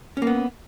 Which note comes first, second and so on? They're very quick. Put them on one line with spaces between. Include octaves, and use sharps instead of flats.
C#4 A#3 B3